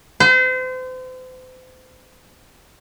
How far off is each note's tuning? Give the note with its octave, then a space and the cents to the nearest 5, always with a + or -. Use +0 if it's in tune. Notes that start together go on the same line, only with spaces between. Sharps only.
C5 -35